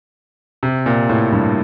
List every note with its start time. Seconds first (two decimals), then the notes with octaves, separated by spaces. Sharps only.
0.63 C3
0.86 A#2
1.09 A2
1.32 G2